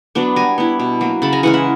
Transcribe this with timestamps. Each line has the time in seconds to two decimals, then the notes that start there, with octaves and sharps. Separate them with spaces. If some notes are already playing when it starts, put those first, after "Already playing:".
0.15 F#3 B3 D4
0.36 G3 G#5 A#5
0.58 B3 E4
0.80 B2
1.01 F#3 A#3
1.22 C#3 A5 B5
1.33 G#5 A#5
1.43 E3 G#3 C#4 F#5 G#5
1.54 E5 F#5